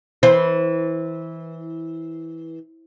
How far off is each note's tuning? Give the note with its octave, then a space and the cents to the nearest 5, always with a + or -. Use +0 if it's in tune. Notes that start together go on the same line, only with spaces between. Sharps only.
E3 -15 C5 +0